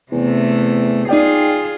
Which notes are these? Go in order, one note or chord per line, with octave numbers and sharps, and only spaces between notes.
E2 C3 A3
D#4 F4 G#4 D5 G5